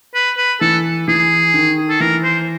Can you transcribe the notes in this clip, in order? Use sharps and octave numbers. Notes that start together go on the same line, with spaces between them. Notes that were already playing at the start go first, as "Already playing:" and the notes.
B4
B4
E3 A4
E3 G#4
D#3
A4
E3 A#4
C5